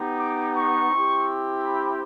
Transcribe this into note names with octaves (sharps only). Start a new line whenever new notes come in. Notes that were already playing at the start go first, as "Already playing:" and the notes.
Already playing: B3 D#4 G4
D6
C#6
C4 E4 G4
B5